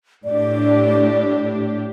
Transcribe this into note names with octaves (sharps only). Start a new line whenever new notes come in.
A2 D4 G4 D5